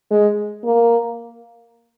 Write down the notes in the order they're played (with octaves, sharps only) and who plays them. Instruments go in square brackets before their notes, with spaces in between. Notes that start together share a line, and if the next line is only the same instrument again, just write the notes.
[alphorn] G#3
A#3